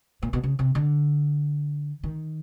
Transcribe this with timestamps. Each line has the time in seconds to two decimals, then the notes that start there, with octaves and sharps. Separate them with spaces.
0.22 A#2
0.33 B2
0.43 C#3
0.59 C3
0.75 D3
2.03 D#3